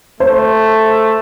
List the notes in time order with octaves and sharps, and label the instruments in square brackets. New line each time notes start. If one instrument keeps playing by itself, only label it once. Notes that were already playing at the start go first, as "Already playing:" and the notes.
[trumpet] A3 [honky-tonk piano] C5